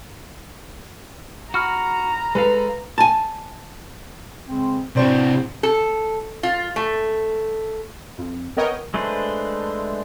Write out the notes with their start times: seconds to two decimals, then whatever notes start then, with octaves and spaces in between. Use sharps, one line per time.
1.54 F#4 A#5 B5 F6
2.35 G#3 A4 B4 F5
2.98 G#5 A5
4.48 C#3 G#3 C4
4.96 A2 C3 C4 D4 F#4 C5
5.63 A4
6.43 F4
6.76 A3
8.18 F2
8.57 B3 A#4 C#5 D#5 G5
8.94 G#3 A3 D4 B4 C5